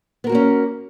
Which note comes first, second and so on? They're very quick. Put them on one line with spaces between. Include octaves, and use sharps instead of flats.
B3 A#4 F#4 A#3 C#4